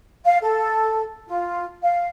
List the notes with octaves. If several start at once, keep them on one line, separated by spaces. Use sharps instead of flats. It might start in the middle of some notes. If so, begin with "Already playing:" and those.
F5
A4
F4
F5